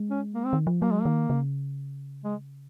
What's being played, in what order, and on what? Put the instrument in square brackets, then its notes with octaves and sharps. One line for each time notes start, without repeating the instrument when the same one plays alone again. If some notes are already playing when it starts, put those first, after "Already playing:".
Already playing: [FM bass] G#3
[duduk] C#4
A#3
C4
[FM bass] D#3
F3
[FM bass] F#3 [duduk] A#3
[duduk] G#3
[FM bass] D#3 [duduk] A#3
[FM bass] C#3
[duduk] G#3